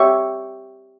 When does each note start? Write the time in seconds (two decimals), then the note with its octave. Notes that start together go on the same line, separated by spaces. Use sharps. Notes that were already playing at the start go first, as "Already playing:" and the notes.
Already playing: G4 C#5 E5 G5 C#6